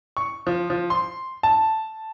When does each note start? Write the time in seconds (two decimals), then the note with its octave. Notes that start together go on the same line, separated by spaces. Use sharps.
0.17 C#6
0.47 F3
0.70 F3
0.90 C6
1.43 A5